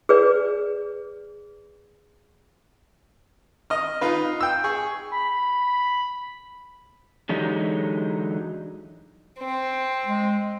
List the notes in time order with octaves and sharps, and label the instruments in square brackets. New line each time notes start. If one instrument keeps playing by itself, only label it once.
[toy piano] G#4 B4 D5
[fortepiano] D#5 F6
D#4 F4 B4
G5 E6
G#4 C#6
[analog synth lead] B5
[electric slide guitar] D3 E3 F#3 G#3 D#4 G4
[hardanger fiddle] C4
[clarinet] G#3